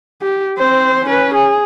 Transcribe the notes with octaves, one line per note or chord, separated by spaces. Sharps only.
G4
C4 C5
C#4 B4
G#4